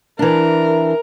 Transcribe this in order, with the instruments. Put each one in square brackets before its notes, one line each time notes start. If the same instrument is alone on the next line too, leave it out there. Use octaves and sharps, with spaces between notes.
[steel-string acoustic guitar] E3 D4 [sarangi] A#4